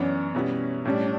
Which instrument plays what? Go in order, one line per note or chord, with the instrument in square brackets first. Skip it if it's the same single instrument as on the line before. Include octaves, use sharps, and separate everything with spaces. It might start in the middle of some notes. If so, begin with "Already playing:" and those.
Already playing: [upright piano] F#2 E3 B3 D4 [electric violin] C#4
[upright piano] B2 G3 B3 E4 [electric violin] C#4
[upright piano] A2 G3 C#4 [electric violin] D4